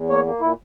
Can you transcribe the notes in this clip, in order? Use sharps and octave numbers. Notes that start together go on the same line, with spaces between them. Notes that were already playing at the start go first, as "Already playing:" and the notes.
Already playing: E2
A#3 C#5
A#3
A#2 E4